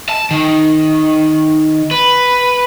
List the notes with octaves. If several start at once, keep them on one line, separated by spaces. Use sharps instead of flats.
A5
D#3
B4